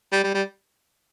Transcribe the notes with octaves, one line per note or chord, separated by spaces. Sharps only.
G3
G3
G3